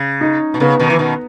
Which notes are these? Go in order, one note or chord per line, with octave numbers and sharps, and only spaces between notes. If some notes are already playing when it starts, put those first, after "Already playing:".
Already playing: C#3
D#4
B2
C#3 B3
B2 D#3
E3
B2 D#3